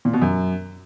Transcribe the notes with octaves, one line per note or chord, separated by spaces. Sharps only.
A#2
B2
F#2